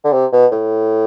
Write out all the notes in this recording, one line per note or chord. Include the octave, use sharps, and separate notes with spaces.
D3
C3
B2
A2